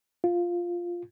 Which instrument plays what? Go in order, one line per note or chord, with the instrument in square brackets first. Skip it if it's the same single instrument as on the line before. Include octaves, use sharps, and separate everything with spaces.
[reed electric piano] F4